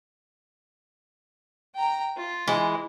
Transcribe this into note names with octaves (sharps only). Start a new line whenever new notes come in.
G5 A#5
F4
E3 G#3